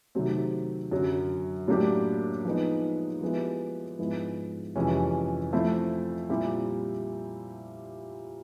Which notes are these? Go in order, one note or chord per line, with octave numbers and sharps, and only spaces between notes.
C3 D#3 F#3 A3 C4
F#2 D3 F#3
A2 F#3 A#3 D4 G4
F3 G#3 B3 D#4
F3 G#3 B3 E4 G4
G#2 F3 G#3 B3 E4
F2 C3 E3 G#3 C#4
F3 A3 C4 E4
A#2 G3 C4 E4 G4